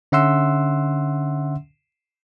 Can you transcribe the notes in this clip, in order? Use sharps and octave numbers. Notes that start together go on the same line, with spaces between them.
D3 C#4 E5 F#5 C6 E6